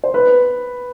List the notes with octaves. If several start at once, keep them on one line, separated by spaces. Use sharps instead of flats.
C5
B4